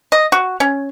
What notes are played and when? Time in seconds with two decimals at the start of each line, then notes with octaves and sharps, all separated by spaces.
0.12 D#5
0.32 F#4
0.60 C#4